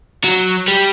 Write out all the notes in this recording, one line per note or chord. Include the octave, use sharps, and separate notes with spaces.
F#3
G3